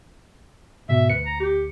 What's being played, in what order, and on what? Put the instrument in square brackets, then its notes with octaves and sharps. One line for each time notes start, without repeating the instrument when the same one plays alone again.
[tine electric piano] G#2 B2 [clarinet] E5
[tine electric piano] D2 C#7 [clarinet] B4
[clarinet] A#5
G4